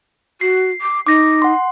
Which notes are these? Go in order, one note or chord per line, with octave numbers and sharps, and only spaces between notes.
F#4 C7
D6
D#4 D6 A#6
F#5 C6